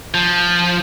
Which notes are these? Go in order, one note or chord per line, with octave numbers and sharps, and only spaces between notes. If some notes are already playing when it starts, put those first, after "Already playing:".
F3